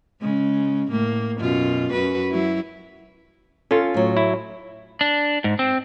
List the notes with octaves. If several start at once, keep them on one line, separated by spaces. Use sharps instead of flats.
C#3 G#3
A2 A#3
F#2 B2 F4
F#2 F#4 B4
F#3 E4
C#4 F4 A4
A2 F#3
E4
D4
G#2
C4